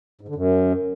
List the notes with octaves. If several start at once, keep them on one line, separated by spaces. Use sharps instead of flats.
G#2
D3
F#2